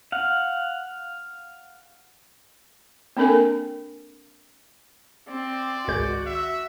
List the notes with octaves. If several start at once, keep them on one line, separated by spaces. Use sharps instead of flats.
F5 F#5
A#3 C4 D4 A4 A#4 G#5
C4 D5
G#1 C#2 F#4 G6
E5